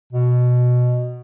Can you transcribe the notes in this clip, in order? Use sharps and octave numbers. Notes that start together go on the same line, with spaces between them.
B2